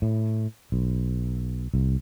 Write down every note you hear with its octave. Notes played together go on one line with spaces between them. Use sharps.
A2
B1
C2